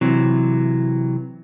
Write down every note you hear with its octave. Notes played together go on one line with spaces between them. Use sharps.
C3 E3 F#3